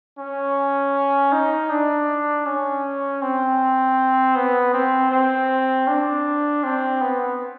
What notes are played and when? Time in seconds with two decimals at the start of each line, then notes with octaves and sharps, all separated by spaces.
0.18 C#4
1.32 D#4
1.70 D4
2.46 C#4
3.22 C4
4.35 B3
4.74 C4
5.11 C4
5.87 D4
6.64 C4
7.01 B3